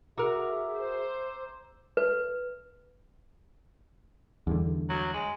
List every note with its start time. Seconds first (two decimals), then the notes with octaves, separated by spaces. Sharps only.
0.18 F#4 G#4 A#4 E5 A#5 D6 E6
0.77 C5
1.97 B4
4.47 E2 G2 D3
4.89 F#3
5.13 G#3